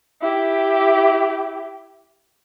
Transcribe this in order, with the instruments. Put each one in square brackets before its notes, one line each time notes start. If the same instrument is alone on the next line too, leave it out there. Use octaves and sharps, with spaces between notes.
[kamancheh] E4 G4